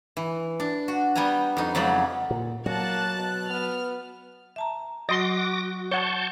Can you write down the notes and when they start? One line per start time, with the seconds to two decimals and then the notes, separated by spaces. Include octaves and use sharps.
0.17 E3
0.60 D4
0.88 F#4
1.15 G3 B3 G5 G#5 A#5
1.57 F2 D#4
1.75 F2 C#3 F#3 G#3 D5 B5
2.31 A#2
2.66 F#3 A#3 F#4 A5 F#6
3.16 B2
3.50 B3 F6
4.56 E5 A5 A#5
5.09 F#3 F#4 D#5 C6 D6 A#6
5.91 C#5 F#5 A5 C#6 G6